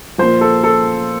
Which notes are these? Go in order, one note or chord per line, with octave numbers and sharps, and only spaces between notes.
A#2 F3 C5
A4
A4